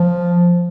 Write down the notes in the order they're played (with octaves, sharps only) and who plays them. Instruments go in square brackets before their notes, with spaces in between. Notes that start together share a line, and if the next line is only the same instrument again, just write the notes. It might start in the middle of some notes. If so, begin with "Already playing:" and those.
Already playing: [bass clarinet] F3